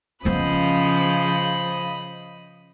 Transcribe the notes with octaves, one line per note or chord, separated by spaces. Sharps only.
C#3 F3 B3 C#4 C5 D#5 B5